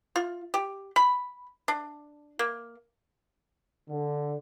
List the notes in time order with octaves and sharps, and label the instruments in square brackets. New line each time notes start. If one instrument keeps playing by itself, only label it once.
[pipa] F4
G4
B5
D4
A#3
[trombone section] D3